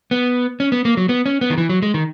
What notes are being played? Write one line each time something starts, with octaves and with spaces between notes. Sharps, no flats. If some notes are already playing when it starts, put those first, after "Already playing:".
B3
C#4
B3
A#3
F#3
B3
C#4
B3
D#3
E3
F#3
G#3
D#3